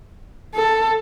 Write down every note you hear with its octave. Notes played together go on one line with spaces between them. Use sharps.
A4